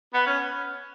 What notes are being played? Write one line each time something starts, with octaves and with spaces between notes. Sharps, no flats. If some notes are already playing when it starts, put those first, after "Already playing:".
B3
C#4